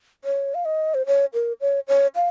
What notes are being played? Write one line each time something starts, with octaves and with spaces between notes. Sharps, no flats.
C#5
F5
D#5
C5
C#5
A#4
C#5
C#5
F5